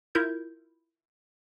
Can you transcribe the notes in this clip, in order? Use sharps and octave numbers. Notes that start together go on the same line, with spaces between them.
E4 F4 A#4 G6 G#6